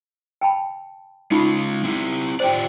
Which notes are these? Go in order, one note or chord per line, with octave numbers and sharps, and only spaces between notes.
G5 A5 B5
G#3 C#4 D#4 F4 B5
C4 E4
F4 G4 C5 D5 G5